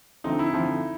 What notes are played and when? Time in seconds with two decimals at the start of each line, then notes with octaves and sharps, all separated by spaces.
0.24 D2 D3 F3 A3 C4 D#4
0.39 E4
0.53 D2 D3 F3 A3 C4